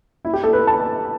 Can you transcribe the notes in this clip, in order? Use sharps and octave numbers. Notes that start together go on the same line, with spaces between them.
E4
G4
A4
B4
A5